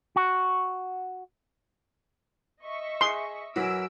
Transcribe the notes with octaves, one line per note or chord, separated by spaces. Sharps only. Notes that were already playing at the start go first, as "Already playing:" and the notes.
F#4
D#5 E5 C#6
G#4 C6 D#6
F#2 E3 F#3 F#4 E6 D7